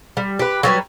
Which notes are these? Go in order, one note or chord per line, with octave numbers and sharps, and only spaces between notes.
G3
G4 B4
F#3 G3 B4 C#5